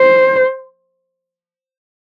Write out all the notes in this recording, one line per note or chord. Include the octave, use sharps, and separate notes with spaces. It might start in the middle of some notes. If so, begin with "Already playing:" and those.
Already playing: C5